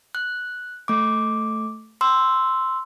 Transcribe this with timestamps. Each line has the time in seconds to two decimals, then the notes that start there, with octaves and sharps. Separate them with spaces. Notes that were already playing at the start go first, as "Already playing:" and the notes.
0.15 F#6
0.88 A3 D6
2.01 C6 E6